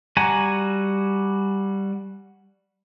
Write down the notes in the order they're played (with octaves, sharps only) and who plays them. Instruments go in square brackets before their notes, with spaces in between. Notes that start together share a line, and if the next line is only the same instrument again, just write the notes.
[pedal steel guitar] G3 F#4 G#5 A#5